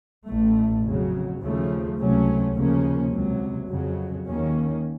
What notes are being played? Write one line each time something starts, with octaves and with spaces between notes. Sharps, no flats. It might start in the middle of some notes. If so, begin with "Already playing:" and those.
A1 A2 A3
F2 C#3 F#3
D#2 C#3 F3 A3
C#2 C3 F#3 A3 C#4
D#2 C#3 F3 A#3 C#4
C#2 C3 F#3
F2 C#3 F#3
D#2 D#3 A#3 C#4